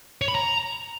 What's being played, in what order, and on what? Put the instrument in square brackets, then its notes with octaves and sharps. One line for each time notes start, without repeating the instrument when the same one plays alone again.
[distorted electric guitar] C#5
B5
A#5